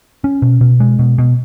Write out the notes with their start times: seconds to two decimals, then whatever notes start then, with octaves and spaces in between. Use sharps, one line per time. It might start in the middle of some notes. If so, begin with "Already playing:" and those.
0.24 C#4
0.42 B2
0.61 B2
0.80 G#3
0.99 B2
1.18 B2